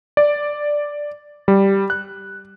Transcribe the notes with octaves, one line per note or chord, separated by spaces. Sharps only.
D5
G3
F#6